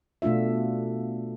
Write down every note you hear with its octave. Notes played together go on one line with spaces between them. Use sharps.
B2 A3 D4 F4 E5